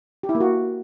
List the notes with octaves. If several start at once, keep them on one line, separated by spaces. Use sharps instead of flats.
G4
E4
A#3
F#4